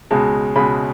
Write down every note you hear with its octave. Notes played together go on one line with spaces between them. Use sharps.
C#2 B2 G#3 A5
C#2 B2 G#3 B5